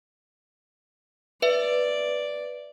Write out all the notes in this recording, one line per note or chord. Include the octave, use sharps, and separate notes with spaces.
B4 D5 E5